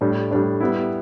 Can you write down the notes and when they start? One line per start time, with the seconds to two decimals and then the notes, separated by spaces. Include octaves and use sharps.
0.01 A2 G3 D4
0.31 A2 G3 D4
0.60 G3 B3 E4